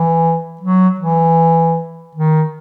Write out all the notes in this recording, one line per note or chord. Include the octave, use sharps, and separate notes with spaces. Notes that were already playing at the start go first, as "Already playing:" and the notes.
Already playing: E3
F#3
E3
D#3